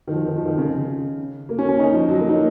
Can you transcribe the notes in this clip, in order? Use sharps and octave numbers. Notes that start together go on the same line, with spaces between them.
D#3
F3
D#3
F3
D#3
C#3
A#3
C#4
C#4
D#4
F3
F#3
A#3
D#4